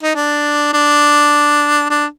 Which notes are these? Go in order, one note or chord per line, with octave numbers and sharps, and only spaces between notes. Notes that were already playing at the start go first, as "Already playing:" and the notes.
D#4
D4
D4
D4